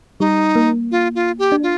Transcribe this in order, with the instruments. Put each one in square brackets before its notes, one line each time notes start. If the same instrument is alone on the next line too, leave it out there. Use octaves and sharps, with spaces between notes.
[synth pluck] G3 [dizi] D#4
[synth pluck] A#3
[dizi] F4
F4
G4
[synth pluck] D4
[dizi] F4